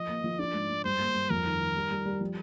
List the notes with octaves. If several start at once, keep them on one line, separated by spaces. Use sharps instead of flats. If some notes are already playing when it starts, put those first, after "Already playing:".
Already playing: F3 D#5
A#3
F3
D4 D5
G#2
G#2
G2 C5
A#3
G2
F2 A#4
D#3
D#3
G3
G3
G3
F3